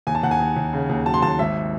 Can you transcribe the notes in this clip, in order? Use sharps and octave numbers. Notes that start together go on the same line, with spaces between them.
D#2 G#5
A5
D#2 F#5
G#5
D#2
D#2
C#3
D#2
F#3 A5
C6
D#2 A5
G#1 E5